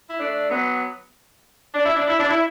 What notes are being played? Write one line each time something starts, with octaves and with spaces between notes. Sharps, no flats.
E4
A3 D4
F#3 B3
D4
E4
D4
E4
D4
E4